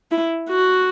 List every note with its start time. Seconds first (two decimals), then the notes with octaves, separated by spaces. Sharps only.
0.11 E4
0.49 F#4